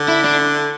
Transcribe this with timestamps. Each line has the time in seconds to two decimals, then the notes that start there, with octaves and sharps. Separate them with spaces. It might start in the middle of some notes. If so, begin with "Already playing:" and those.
Already playing: D3
0.08 E4
0.24 D4